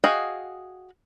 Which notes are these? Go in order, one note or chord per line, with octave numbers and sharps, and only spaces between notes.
F#4 G#4 D#5 F5 G5